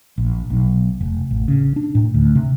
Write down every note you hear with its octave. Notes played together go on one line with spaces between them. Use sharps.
A#1
B1
F1
A1
C#3
D4
A2
D2
C3